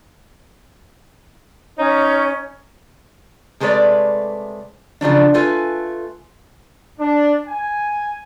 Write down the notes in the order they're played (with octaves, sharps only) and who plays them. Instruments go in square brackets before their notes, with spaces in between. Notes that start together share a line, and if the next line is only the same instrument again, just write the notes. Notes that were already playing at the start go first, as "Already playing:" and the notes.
[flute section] C#4 C#5 [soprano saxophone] D#4
[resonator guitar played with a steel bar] C3 G#3 A3 B4 C#5 D5
C#3 F3 F#3 D4
A3 F4 B4 G#5
[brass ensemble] D4
G#5